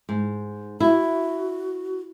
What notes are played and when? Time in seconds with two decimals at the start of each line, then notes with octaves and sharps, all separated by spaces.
0.09 G#2
0.80 E4 F#4